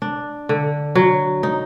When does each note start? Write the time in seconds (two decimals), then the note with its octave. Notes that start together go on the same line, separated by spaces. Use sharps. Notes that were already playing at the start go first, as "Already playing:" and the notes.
0.02 D4
0.49 D3
0.95 F#3
1.43 D#4